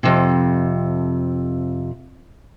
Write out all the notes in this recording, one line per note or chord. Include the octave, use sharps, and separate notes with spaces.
F2 C3